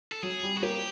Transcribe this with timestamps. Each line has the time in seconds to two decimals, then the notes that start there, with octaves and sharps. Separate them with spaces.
0.12 A4
0.23 F#3 G#4
0.43 G3
0.57 F#4
0.63 A#3 G4